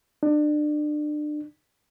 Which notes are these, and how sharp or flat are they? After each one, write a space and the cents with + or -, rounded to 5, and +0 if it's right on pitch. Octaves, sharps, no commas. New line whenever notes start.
D4 +30